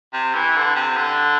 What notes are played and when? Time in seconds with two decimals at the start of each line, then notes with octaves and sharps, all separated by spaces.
0.13 C3
0.35 E3
0.56 D3
0.75 C3
0.96 D3